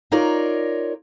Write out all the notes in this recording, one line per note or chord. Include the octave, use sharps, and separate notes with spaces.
D#4 F4 A#4 C#5 D5